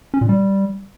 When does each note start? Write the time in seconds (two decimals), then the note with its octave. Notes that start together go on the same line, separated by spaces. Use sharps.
0.14 C#4
0.21 A#2
0.29 G3